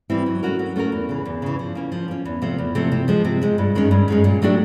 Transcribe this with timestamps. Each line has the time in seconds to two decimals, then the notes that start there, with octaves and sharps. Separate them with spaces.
0.10 E3 G3 C4 E4
0.26 F#3
0.43 A3 C#4 F#4 A#4
0.59 F#3
0.76 A3 C#4 F#4 A#4
0.92 E2
1.09 C#3 E3
1.25 E2
1.42 C#3 E3
1.59 F3
1.75 A#3 C#4
1.92 F3
2.08 A#3 C#4
2.25 E2
2.42 C3 F3 A3
2.58 E2
2.75 C3 F3 A3
2.92 C3
3.08 F3 G#3
3.25 C3
3.41 F3 G#3
3.58 G2
3.75 D#3 G#3 C#4
3.91 G2
4.08 D#3 G#3 C#4
4.24 A#2
4.42 F#3 A3 D4 G4